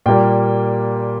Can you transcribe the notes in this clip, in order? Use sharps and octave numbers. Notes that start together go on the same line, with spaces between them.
A#2 G3 A#3 G5